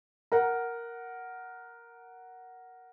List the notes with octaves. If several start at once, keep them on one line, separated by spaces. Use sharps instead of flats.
A#4 F#5